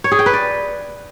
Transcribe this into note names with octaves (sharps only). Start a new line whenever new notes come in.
C#5
G#4
G5
B4
D5